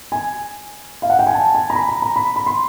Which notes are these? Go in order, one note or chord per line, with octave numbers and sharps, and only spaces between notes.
G#5
F5
F#5
G5
G#5
A5
G#5
A#5
B5
A#5
A#5
B5
B5
C6